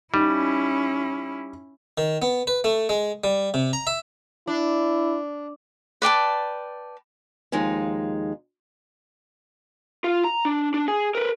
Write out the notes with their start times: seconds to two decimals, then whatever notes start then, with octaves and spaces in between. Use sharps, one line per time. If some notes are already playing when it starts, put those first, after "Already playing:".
0.14 G3 C#4 D#4 E4
1.98 D#3
2.22 B3
2.47 B4
2.64 A3
2.89 G#3
3.24 G3
3.54 C3
3.73 A#5
3.87 E5
4.47 D4 E4
6.02 B4 D5 G5 A5
7.52 D#2 F3 G#3 D#4
10.04 F4
10.24 A#5
10.45 D4
10.74 D4
10.88 G#4
11.15 A#4 B4